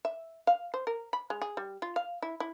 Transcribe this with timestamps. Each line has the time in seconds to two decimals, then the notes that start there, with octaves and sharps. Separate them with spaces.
0.05 E5
0.47 F5
0.74 C5
0.87 A#4
1.13 B5
1.30 G#3
1.42 G#4
1.57 G3
1.82 F4
1.96 F5
2.22 E4
2.40 E4